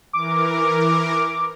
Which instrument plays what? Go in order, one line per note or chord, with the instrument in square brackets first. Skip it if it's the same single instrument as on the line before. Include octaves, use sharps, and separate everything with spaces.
[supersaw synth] E3 A#4 [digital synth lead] D6